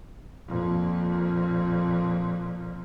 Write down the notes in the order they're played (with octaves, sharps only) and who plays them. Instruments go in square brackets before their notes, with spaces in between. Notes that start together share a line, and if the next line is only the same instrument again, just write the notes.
[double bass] F2 A#2